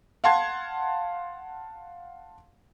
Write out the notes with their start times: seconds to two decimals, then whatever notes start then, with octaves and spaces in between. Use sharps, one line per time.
0.24 F5 F#5 A5 C6 G#6